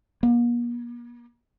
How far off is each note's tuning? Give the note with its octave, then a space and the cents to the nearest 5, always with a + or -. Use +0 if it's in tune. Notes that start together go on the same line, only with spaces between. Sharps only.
A#3 +45